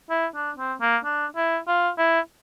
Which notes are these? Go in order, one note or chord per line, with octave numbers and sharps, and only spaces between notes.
E4
D4
C4
A#3
D4
E4
F4
E4